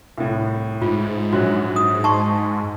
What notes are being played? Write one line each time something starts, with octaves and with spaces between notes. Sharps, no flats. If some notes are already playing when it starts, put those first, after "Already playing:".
C2 A2
G#2 F4
A#1 F#3 F#4 F#6
D#6
D#5 A5 C6 C#6